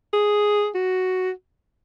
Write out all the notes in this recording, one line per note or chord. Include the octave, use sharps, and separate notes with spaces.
G#4
F#4